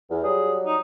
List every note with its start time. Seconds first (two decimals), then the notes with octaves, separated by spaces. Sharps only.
0.10 E2
0.24 F#3 G3 G#4
0.66 D#4